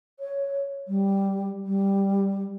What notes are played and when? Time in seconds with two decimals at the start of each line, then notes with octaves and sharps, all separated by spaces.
0.19 C#5
0.88 G3
1.65 G3